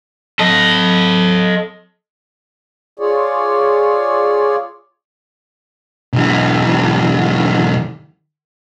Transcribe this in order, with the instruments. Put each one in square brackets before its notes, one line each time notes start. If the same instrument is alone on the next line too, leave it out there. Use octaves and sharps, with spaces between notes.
[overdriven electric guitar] A4 D#5
[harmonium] F4 G#4 C#5 D5
[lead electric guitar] B1 E3